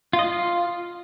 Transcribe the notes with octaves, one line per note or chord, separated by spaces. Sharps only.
F4
D#5
F4